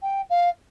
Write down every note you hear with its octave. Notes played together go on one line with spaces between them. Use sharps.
G5
F5